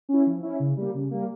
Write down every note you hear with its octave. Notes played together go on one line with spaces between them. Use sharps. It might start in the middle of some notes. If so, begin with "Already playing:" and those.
C#4 E4
F3
C#4 E4
C#3
G3 A#3
C#3
G3 A#3